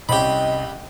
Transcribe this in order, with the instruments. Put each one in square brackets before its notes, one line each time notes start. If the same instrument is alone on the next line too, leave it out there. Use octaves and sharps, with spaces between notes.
[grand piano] C2 C4 C#4 [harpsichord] G4 B5 [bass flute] D#5